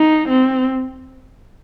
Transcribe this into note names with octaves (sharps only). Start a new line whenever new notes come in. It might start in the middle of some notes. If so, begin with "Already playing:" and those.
Already playing: D#4
C4